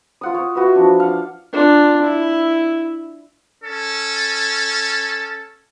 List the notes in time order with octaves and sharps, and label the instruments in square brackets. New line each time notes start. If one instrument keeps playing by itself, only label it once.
[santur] F4 F#5 D#6
C#5
F#4 B4 E5
F3 D4
F5 F#5
[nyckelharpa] D4 F4
E4
[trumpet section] C#4 A4